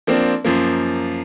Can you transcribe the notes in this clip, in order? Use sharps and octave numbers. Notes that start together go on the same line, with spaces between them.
F3 A#3 C4 D4
F#2 F3 A#3